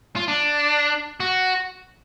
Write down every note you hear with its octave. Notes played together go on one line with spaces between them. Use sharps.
F4
D4
F#4